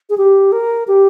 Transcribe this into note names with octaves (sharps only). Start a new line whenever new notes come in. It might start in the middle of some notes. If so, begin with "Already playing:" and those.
G#4
G4
A#4
G4